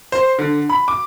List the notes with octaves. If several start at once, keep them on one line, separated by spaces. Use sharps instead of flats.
C5
D3
B5
D6